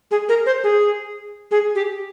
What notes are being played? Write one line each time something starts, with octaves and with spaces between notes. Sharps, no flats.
G#4
A#4
C5
G#4
G#4
G4